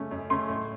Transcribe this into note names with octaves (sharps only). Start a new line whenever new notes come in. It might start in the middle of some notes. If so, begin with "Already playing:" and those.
Already playing: F#2 C#3 A3 C#4
F#2
C#3 A3 C#4 C6
A2